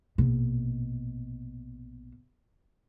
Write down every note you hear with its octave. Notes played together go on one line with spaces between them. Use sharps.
A#1 B2